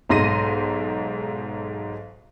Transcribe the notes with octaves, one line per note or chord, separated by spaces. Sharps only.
B1 G#2 C6 A#6 D#7